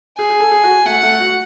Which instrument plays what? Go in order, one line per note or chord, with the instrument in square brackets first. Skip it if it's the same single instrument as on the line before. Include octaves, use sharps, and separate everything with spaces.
[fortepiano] G#4 [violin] G#5
[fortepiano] G#4
A4
G#4
F#4
[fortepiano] A3 [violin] F#5
[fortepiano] A3
F#4